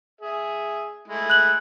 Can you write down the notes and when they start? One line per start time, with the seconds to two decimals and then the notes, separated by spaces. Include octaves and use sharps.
0.21 G#4 E5
1.08 G#3 A3 E4
1.30 F#6 F#7